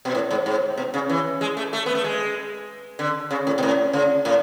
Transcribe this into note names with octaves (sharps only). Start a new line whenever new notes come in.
B2
A2
G#2
G#2
B2
C#3
E3
G#3
A3
A3
B3
A3
G#3
D3
C#3
A2
B2
A2
C#3
A2